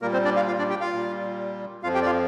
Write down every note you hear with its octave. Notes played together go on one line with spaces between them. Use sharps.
A#2 G3 A#3 A#4
C4 C5
D4 D5
F4 F5
F4 F5
D4 D5
G4 G5
F4 F5
A#2 G3
F2 F3 F4 F5
G4 G5
D5
F4 F5